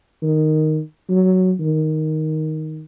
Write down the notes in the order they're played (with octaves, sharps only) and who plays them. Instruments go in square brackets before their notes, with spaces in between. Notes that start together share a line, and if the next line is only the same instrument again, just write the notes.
[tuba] D#3
F#3
D#3